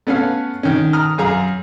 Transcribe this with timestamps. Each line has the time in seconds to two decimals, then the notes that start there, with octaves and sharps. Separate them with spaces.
0.07 A3 B3 C#4 B4 F5
0.63 D#3 C#4
0.93 A#5 D#6 F6
1.18 F#2 G#4 F5 A#5